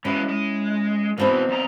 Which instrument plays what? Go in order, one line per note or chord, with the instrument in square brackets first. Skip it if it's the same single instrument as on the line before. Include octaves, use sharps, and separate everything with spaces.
[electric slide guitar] E3 G#3 [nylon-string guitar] C#4 E4
[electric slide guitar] G#3
[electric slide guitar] E2 B2 E3 [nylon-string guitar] B3 C4 D#4
[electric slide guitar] E2 A#5